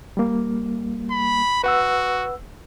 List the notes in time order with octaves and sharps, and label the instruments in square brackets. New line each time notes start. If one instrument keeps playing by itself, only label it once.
[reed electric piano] G3 A#3
[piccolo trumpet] B5
[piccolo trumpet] F#4 [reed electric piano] B4 F#5 E6